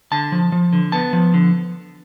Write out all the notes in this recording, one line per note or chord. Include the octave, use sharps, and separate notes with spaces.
D3 A5
F3
F3
D3
B3 A5
F3
D3